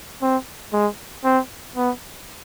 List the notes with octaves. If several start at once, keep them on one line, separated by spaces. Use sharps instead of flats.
C4
G#3
C4
B3